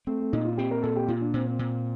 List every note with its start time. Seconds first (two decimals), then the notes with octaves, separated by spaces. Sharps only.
0.07 A3 C4
0.20 A3
0.33 A#2 D#4
0.45 F4
0.58 C4 G4
0.71 A#4
0.83 A#2 A4
0.96 G4
1.08 A#2 F4
1.21 D4
1.34 A#2 C4
1.47 C4
1.59 A#2